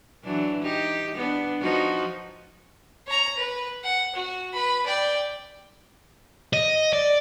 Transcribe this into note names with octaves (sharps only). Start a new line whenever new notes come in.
E3 F#3 D4
D#4 G4
B3 D4
F3 D#4 F#4
C#5 A#5
B4
F#5
F#4
B4 B5
D5 G5
D#5
D5